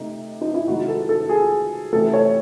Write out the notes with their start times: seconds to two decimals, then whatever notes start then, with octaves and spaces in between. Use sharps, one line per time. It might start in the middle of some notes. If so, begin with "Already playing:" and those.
Already playing: C3 A3 D#4
0.41 D#4
0.55 E4
0.67 C3 D#3 G#3 F#4
0.88 A4
1.09 A4
1.29 G#4
1.93 C3 E3 A3 A4
2.13 C#5